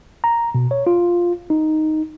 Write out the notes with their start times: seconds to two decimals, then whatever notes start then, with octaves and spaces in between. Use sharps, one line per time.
0.24 A#5
0.55 B2
0.71 C#5
0.87 F4
1.50 D#4